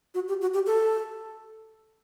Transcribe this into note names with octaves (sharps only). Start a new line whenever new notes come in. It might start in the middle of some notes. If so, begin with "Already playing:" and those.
F#4
G4
F#4
G4
A4